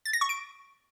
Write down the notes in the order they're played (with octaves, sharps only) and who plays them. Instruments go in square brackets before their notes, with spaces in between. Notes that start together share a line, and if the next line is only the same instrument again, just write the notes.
[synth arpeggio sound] A6
A#6
C#6
D7